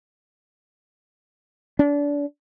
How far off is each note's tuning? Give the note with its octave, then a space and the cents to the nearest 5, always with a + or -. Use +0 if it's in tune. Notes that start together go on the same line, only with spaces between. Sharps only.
D4 -30